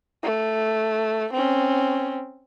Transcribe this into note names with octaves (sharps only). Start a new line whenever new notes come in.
A3
C4 C#4